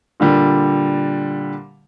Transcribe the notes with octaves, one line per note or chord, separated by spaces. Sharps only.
A#2 D3 G3